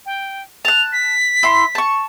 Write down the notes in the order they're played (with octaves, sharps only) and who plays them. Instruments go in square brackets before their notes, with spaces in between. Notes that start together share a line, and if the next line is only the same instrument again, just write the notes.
[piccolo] G5
[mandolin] A5 F#6 [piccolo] F7
[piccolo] B6
[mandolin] E4 C6
A5 C#6